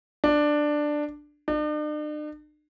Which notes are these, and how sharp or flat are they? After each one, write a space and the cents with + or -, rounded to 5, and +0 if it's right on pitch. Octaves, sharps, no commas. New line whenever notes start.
D4 +10
D4 +45